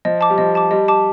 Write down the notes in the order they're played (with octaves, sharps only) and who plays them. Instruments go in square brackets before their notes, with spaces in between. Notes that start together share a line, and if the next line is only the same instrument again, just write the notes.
[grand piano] F3 [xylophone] D#5
[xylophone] A5 D6
[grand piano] G3
[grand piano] F3 [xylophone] D#5
[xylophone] A5 D6
[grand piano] G3 [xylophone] D#5
[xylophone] A5 D6